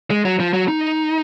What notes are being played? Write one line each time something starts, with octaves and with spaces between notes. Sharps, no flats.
G#3
F#3
F3
F#3
D#4